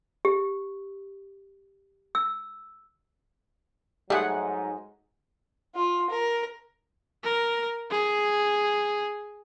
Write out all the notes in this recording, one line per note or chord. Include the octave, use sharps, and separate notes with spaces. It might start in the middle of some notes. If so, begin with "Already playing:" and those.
G4
E6
G#2 F#3 G3 A3 D#4 G#4 F#5
F4
A#4
A#4
G#4